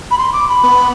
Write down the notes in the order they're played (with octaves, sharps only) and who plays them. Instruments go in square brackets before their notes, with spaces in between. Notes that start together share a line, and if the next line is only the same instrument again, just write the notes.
[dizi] B5
C6
D6
B5
[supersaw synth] B3